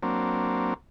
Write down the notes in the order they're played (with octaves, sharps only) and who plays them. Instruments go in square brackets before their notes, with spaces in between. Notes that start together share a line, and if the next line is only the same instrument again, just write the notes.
[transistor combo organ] F#3 A#3 C4 D4